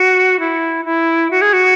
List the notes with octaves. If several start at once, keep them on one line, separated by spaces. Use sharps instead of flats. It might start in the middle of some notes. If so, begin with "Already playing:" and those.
Already playing: F#4
E4
E4
F#4
G#4
F#4